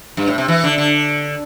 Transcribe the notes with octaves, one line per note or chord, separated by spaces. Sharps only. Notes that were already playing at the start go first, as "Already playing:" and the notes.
G2
A2
C3
E3
D3
D3